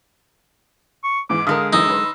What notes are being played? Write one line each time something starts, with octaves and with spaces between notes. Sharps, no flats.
C#6
G#2 E3 D6
D3 G#3 A#4 F5 D#6 B6
F#2 E3 D#4 E6
B4 C6